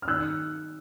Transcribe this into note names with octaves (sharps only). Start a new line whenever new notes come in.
F6
D#3 E6 F#6